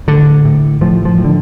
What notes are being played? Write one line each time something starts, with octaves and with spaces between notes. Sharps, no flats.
A2 D3
A2
A2 F3
F3
A2
D3